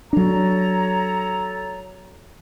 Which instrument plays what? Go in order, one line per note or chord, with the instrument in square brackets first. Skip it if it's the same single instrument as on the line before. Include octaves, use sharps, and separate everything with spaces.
[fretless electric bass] F#3 D4 [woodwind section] A4 C#5 A#5